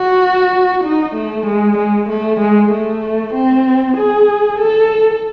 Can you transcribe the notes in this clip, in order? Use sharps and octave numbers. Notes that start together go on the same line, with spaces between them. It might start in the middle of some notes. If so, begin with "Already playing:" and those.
Already playing: F#4
D#4
A3
G#3
G#3
A3
G#3
A3
C4
G#4
A4